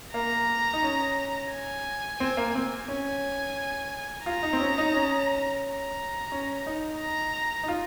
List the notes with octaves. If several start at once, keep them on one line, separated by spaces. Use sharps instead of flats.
A#3 A#5
D#4
C#4
G#5
C4
A#3
C4
C#4 G#5
F4 A#5
D#4
C4
C#4
D#4
C#4
A#5
C#4
D#4
A#5
D#4
F4